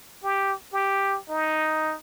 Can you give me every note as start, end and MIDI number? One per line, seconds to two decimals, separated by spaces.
0.24 0.53 67
0.73 1.18 67
1.30 1.95 63